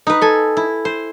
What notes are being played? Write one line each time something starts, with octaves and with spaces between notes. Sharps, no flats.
D#4 B4
A4 G#5
E4
C5